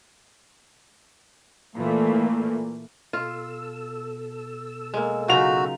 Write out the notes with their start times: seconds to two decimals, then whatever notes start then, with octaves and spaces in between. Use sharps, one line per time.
1.76 A#2 E3 A3 A#3
3.13 B2 F4 A4 E6
4.94 G#3 A#3
5.28 C#3 F#3 D#4 F4 F#4 F7